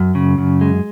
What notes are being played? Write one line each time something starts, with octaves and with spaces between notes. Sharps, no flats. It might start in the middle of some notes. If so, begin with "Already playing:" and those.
Already playing: F#2
C#3
F#2
G#3